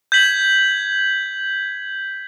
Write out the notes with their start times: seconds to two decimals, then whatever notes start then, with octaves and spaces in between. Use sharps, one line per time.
0.12 G6 G#6 B6 F#7